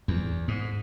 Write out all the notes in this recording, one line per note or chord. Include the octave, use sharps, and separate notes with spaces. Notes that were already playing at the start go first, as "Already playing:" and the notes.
E2
G#2